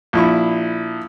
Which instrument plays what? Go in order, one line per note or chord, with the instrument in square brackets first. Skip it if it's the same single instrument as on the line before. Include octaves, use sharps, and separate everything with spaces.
[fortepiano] A#1 E4 C#6